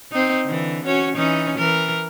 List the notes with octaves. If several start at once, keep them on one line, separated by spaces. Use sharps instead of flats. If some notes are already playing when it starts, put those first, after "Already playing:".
C4 D#4
D3 E3
C#4 F#4 C#5
E3 C#4 D#4
E3 A#4